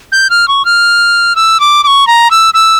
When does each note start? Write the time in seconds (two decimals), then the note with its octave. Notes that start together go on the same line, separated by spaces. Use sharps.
0.12 G6
0.30 F6
0.48 C#6
0.65 F6
1.36 E6
1.60 D6
1.84 D6
1.87 C#6
2.07 A#5
2.31 E6
2.54 E6